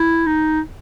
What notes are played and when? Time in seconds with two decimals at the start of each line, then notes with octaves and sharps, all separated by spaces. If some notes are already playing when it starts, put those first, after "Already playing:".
Already playing: E4
0.27 D#4